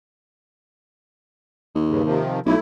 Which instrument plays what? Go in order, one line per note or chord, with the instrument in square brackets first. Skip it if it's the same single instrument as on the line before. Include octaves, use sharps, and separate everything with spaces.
[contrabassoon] D#2
[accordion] G2 C#3
C3 D#3 F3
[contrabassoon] B1 [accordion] A3 E4